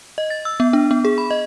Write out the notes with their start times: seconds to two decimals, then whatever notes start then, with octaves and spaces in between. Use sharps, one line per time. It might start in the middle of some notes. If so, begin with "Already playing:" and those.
0.18 D#5
0.30 A6
0.45 E6
0.60 B3
0.73 D4
0.91 B3
1.05 G#4
1.18 B5
1.31 D#5